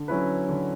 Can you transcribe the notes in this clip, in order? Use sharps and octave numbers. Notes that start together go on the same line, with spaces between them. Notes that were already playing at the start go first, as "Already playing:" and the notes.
Already playing: D3
F#3 C#4 E4 B4
D3